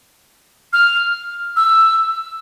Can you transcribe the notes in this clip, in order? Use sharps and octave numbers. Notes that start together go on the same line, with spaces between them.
F6
E6